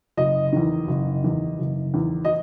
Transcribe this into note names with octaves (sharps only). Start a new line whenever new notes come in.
F#1 D#5
E2 D#3
F#1
E2 D#3
F#1
E2 D#3
D#5